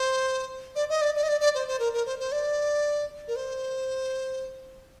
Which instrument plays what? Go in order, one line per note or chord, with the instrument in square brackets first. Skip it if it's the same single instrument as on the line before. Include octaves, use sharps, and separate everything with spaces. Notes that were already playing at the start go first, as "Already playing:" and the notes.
Already playing: [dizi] C5
D5
D#5
D5
D5
D#5
D5
D5
C5
C5
A#4
A#4
C5
C5
D5
A#4
C5